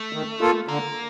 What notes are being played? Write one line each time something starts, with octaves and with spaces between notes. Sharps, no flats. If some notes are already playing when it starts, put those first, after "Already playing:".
Already playing: A3
D#3
A#3 F4 A4
D3 A#3